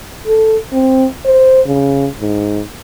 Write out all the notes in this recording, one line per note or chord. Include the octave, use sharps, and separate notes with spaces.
A4
C4
C5
C#3
G#2